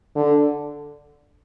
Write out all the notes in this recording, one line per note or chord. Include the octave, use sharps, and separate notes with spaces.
D3